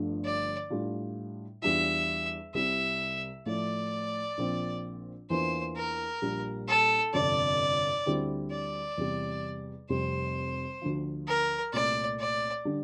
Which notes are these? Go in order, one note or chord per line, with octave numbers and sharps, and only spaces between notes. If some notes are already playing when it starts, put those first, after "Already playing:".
Already playing: G1 G2 D3 F3 A3
D5
A2 G3 D4 F4
E2 E3 G3 D4 F4 E5
C2 C3 G3 C4 E4 E5
A2 F3 A3 E4 D5
A#1 A#2 F3 C4
E2 E3 A#3 D4 F4 C5
A#4
A#1 A#2 G3
A4
G1 F2 C3 D5
D2 D3 G3 C4 E4
D5
E2 C3 G3
F1 F2 C3 G3 C5
D2 D3 F3
A#4
C2 A#2 A3 D5
D5
D3 G3 D4